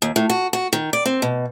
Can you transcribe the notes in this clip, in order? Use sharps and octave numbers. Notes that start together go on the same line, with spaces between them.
D#2
A2
F#4
F#4
D#3
D5
C4
B2